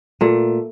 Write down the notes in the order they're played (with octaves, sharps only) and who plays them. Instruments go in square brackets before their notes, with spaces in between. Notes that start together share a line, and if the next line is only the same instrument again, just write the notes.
[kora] A#2 A3